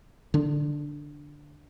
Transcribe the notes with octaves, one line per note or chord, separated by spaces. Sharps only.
D3 D4